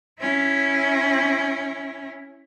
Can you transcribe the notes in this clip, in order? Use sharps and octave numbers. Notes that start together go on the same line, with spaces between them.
C#4 E4